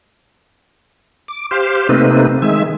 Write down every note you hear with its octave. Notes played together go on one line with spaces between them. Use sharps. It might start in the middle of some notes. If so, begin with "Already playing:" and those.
D6
G4 C5 F5
C3 A3 A#3 C4 D#4 B4
D#3 G#3 E5